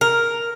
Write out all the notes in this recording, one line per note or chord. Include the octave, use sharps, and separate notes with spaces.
A#4